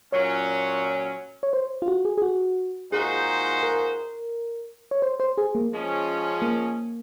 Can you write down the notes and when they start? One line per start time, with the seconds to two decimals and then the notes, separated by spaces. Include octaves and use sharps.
0.12 A#2 F#3 C#4 C#5
1.43 C#5
1.53 C5
1.82 F4
1.88 F#4
2.05 G#4
2.18 G#4
2.22 F#4
2.92 A#2 G#3 D#4 F#4 G#4 C5
3.63 A#4
4.91 C#5
5.02 C5
5.20 C5
5.38 G#4
5.55 A#3
5.72 F3 G#3 C#4
6.42 A#3